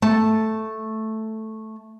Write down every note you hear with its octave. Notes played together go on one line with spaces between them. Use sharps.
A3 A5